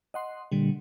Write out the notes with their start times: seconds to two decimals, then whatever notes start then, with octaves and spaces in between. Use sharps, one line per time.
0.14 D#5 F#5 C6
0.52 A#2 D3 G3